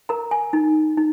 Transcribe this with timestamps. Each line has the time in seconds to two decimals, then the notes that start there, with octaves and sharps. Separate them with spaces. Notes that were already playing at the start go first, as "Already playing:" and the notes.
0.09 A#4 A#5
0.31 G#5
0.53 D#4
0.97 D#4